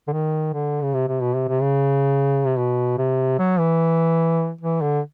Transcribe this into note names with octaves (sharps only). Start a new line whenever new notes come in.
D3
D#3
D3
C#3
C3
C3
B2
C3
C3
C#3
C3
B2
C3
F#3
E3
E3
D3